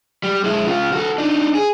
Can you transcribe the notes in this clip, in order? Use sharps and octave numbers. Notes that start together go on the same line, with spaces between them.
G3
G#3 E4
C#3 F4
F#4 A4
D4 D#4
G#4